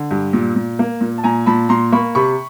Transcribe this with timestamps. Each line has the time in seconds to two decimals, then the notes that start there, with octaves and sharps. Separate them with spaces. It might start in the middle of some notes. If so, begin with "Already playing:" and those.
Already playing: D3
0.11 G2
0.33 A#2
0.56 A#2
0.79 A#3
1.01 A#2
1.18 A5
1.24 A#2 G#5 A#5
1.46 A#2 A5 B5
1.69 A#2 A#5 C6
1.92 A#3 B5 C#6
2.15 C3 B5 C#6